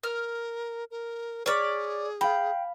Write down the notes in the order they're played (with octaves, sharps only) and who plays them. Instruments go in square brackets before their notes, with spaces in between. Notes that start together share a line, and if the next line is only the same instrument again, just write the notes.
[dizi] A#4 [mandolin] F6
[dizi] A#4
[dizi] G#4 [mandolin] C#5 D5 [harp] F6 B6 D7
[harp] F5 B5 [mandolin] G5